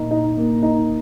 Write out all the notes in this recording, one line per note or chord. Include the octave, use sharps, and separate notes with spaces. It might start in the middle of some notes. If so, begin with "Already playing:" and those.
Already playing: A#2 A#3 D#4
D#4
A#3
D#4